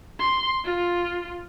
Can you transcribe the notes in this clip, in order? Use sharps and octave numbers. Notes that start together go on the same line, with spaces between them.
C6
F4